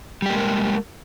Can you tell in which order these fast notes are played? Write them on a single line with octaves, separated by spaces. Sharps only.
G3 G4 A#3 G#3 A#4